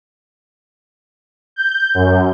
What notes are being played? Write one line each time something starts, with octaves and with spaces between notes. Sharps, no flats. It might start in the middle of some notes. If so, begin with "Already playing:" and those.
G6
F#2